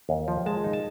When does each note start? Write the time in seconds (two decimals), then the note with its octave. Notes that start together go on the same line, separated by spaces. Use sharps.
0.09 D#2
0.28 F3
0.46 G#3 A5
0.64 D#4
0.73 A5